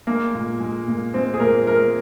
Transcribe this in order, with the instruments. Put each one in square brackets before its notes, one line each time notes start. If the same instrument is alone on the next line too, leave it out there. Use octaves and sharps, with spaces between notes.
[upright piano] G#3 A#3
A#2
G#3
A#2
G#3 C4
G#4
A#2 A#4
G#3 A#4